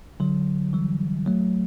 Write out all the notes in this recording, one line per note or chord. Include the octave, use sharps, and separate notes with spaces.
D3 F#3
E3 G3
F#3 A3